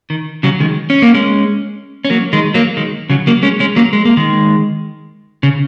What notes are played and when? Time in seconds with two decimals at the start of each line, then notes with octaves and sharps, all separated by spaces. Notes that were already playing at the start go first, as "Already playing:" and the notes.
0.10 D#3
0.43 C#3 F#3
0.60 D#3 G#3
0.90 C#4
1.02 A#3
1.14 G#3 C#4
2.05 C#4
2.10 F#3 A#3
2.33 D#3 G#3
2.54 F#3 A#3
2.77 D#3 G#3
3.10 C#3 F#3
3.27 F#3 A#3
3.43 G#3 C#4
3.60 G#3 C#4
3.76 F#3 A#3
3.93 G#3
4.05 A#3
4.17 D#3 G#3
5.43 C#3